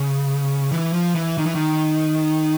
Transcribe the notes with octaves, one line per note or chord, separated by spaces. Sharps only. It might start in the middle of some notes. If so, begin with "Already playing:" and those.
Already playing: C#3
E3
F3
E3
D#3
E3
D#3